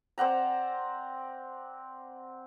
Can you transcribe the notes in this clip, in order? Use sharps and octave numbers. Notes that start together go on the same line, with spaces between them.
C4 D5 F#5 A#5